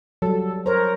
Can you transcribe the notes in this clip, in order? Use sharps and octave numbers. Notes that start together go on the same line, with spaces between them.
F#3 G3 A4
A#4 C5 C#5 A#5